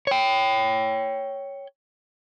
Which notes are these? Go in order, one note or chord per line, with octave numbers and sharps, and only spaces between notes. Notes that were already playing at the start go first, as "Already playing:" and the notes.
C#5 G5